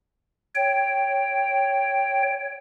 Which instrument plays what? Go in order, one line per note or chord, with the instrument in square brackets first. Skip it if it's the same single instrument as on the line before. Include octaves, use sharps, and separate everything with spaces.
[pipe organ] C#5 G5